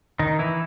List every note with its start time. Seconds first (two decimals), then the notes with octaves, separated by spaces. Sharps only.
0.19 D#3 D#4
0.39 E3 E4